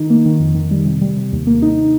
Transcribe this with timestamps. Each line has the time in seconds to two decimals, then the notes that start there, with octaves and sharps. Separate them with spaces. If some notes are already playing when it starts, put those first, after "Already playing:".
Already playing: D#3 D#4
0.10 A#3
0.26 D#3
0.40 F2
0.55 D#3
0.71 G3
0.85 C3
1.02 G3
1.17 C3
1.32 D#2
1.47 A#3
1.62 D#4